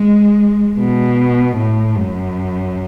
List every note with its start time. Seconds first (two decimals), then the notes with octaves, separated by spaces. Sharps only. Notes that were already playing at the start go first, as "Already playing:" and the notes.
Already playing: G#3
0.79 B2
1.57 A2
1.97 F#2